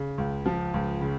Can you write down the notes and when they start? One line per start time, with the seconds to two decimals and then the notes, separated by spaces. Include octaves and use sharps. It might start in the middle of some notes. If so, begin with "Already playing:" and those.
Already playing: C#3
0.18 C#2
0.46 F3
0.74 C#2
1.01 C#3